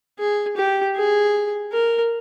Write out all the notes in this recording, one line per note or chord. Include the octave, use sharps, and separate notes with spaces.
G#4
G4
G#4
A#4